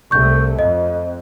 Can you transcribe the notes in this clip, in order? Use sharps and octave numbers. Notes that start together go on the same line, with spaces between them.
C2 A3 C#6 G6
F2 D#5